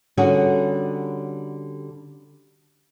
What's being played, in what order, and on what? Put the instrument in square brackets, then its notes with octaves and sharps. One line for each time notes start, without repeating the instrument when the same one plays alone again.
[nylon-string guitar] D3 G3 C#4 F#4 G#4